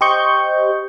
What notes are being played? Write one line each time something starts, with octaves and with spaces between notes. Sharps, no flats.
G4 C5 D#5 C#6 G6